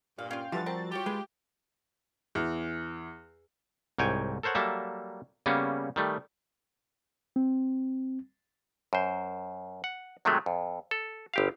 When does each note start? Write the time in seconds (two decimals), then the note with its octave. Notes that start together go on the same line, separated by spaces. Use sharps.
0.19 G2 A#2 F5
0.31 C#4 F4 F5 G5
0.52 G2 D3 E3 F3 G3 F#4 A6
0.66 C4 G4 A#4 A5
0.92 F4 G4 C#5 D5
1.06 G#3 G#4 B4
2.35 E2
3.99 C2 G#2 C#5 G5 G#5
4.43 A4 A#4 C5 C#5 F#5
4.55 F#3 G3 A#3 A4 E5
5.46 C#3 G3 A#3 B3 C#4
5.96 D#3 G3 A3
7.36 C4
8.93 F#2 C5
9.84 F#5
10.25 C3 D#3 F#3 G#3 A3
10.46 F2
10.91 A4
11.34 G1 G4 F5